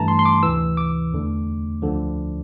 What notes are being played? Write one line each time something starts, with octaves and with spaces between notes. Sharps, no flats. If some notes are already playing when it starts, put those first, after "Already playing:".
Already playing: G2 E3 A3 A5 A#5
C6
C6
D6
D2 C3 E3 E6
D6
E2 D3 A3
D2 D3 F3